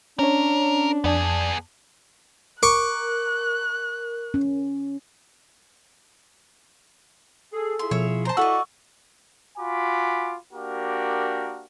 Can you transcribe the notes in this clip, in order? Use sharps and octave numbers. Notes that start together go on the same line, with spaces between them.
C#4 D4 A#4 C#5
F2 B3 G#4 D5 A5
A#4 C#6 D6 F#6
C#4
G#4 A4
E4 F4 G#4 C6
B2 F3 C#5 E5
C5 A5 A#5
E4 F#4 A4 D5 D#5 C#6 E6
F4 F#4 G#5 B5 D6
A#3 D4 F#4 G4 A#4